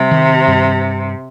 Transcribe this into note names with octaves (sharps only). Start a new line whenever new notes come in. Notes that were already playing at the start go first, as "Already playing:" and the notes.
Already playing: C3 G3
D#3
G2